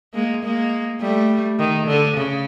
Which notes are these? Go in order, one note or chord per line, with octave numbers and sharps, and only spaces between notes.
G#3 A#3
G#3 A#3
G3 A3
D#3
D3
C#3